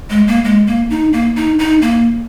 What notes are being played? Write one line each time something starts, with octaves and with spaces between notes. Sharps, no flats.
G#3
A#3
G#3
A#3
D#4
A#3
D#4
D#4
A#3